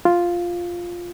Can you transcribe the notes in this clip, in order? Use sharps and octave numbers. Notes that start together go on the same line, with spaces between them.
F4